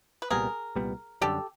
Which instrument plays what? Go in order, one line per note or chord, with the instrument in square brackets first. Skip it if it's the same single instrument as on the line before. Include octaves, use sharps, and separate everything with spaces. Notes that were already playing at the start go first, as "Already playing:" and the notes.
[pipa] B4
[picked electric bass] C2 A#2 G3 B3 [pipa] G#4 A#4
[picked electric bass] C2 A#2 G3 B3
[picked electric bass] F#2 D3 G3 [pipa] G4 A4